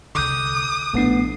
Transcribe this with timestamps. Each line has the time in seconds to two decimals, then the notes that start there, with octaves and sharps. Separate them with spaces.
0.15 C2 D3 D6 D#6 F#6 G6
0.94 A#1 A2 A3 B3 D4 C7